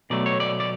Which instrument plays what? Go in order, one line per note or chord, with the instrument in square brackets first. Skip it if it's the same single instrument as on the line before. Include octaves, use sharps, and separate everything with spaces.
[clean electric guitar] B2 F#3 A3 D5
C#5
D5
D5